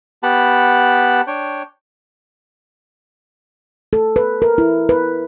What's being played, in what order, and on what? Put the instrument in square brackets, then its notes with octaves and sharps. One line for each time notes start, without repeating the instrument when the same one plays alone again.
[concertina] B3 G4 F#5 A5 B5
D4 C#5 G5
[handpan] A4
B4
A#4
E4
B4